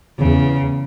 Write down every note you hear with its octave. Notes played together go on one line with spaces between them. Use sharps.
E2 C#3